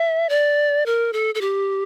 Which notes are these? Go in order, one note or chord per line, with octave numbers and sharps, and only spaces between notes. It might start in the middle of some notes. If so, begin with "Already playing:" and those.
Already playing: E5
D5
A#4
A4
A4
G4